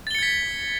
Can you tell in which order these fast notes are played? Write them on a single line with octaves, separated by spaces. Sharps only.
A6 G7 C#7 G#6 B6